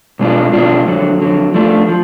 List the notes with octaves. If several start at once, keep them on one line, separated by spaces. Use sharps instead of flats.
B2 G#3 D4 F4
B2 G#3 D4 F4
F2 D3 F#3
F2 D3 F#3
F3 A3 D4
F3